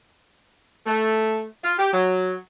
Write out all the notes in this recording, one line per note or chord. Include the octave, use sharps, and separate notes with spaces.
A3
F4
G4
F#3